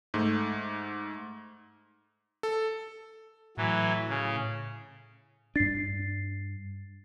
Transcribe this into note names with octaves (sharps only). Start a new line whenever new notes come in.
G#2 A3
A4
A2 E3 F#3
C#3
G2 D4 A6 C7